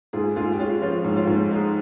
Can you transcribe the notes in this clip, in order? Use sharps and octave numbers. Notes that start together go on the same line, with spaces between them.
G#2 F4 G#4
G#2 F4 G#4
G4
G#3 C#4 F4
F3 C#4 F4
G#2
C#4 F4
G#2
G#3 D#4